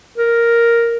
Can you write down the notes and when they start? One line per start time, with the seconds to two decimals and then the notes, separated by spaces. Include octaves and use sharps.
0.18 A#4